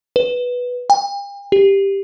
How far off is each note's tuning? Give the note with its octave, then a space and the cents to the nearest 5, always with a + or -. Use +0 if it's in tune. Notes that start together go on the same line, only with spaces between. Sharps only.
B4 -5
G5 +45
G4 +5